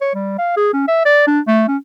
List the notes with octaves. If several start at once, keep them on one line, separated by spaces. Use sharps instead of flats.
C#5
G3
F5
G#4
C#4
E5
D5
D4
A3
C#4